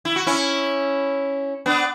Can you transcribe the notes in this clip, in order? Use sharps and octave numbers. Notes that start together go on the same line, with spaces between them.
E4
F#4
C#4 E4
B3 D4